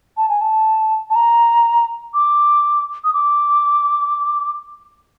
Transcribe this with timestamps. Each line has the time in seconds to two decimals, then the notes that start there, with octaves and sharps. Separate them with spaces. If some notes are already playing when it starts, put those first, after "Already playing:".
0.17 A5
0.29 G#5
0.41 A5
1.10 A5
1.16 A#5
2.14 D6
3.04 D#6
3.14 D6